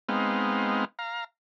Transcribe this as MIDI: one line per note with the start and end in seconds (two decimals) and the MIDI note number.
0.09 0.85 56
0.09 0.85 59
0.09 0.85 60
0.09 0.85 63
0.09 0.85 77
0.99 1.24 77
0.99 1.24 82